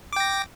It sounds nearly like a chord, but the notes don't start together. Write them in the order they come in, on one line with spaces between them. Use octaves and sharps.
D6 G5 A#6